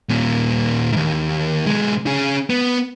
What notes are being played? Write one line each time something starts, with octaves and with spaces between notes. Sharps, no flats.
D#2 A#2
D#2 G#2
B1 G#3
C#4 G#4
B3